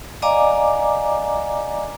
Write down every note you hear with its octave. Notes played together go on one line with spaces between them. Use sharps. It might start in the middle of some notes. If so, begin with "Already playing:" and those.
D5 D#5 F5 G#5 A#5 D6